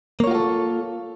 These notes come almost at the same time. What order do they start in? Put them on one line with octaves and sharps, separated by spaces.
A#3 C#5 F4 F#4 A4